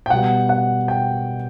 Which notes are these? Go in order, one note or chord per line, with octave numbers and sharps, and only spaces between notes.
G5
B2 G3 B3 F#5
F#5
G5